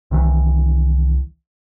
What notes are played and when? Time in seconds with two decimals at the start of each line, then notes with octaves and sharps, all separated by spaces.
0.11 C2 D#3 E3